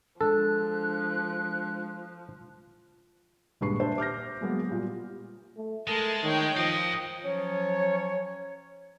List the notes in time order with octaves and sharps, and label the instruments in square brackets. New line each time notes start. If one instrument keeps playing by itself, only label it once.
[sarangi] F3 [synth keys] G#3 D4 [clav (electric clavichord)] A4 [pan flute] F#6
[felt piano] D#1 G2 G#3 B4 C#6 C7
D4 G4 B4 C5 E5
D6 F6 G6 A#6
F#3 G#3 A#3 B3
A#2 G3
[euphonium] A3
[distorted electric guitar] G#3 [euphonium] A3 [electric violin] A#4 A5
[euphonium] D#3 [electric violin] C#5 G5
[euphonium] F3 [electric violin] D#5 [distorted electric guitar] F5 G5
[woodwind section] F3 F#3 C#4 C#5